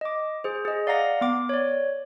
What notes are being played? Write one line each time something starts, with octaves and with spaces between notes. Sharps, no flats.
D#5 D6
G#4 C5
G#4 D#5
D5 F5 F#5 A#5 A#6
B3 D6
C#5 D5